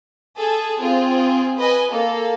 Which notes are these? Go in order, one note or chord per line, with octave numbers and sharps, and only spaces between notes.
G#4 A4
C4 F4 G#4
B4 D#5 G#5
A#3 A4